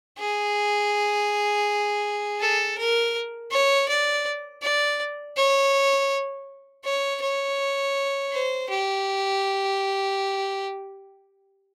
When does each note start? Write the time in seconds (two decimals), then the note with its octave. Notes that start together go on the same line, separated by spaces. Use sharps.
0.18 G#4
2.41 A4
2.78 A#4
3.51 C#5
3.89 D5
4.62 D5
5.37 C#5
6.84 C#5
7.22 C#5
8.32 C5
8.70 G4